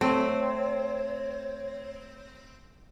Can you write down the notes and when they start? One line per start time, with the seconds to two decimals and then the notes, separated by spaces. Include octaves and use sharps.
0.01 A3 C4 C#5